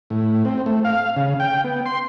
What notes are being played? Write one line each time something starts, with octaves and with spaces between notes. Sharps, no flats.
A2
C4
A3
F5
C#3
G5
B3
C6